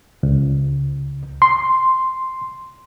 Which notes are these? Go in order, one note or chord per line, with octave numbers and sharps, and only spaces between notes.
C#2
C6